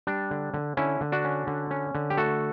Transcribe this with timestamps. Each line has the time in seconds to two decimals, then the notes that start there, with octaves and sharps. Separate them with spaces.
0.07 G3 D4
0.31 D3
0.54 D3
0.77 D3 C#4 E4
1.01 D3
1.12 D4 F#4
1.25 C#4
1.47 D3
1.71 C#4
1.95 D3
2.10 G4
2.17 A3 F#4 A4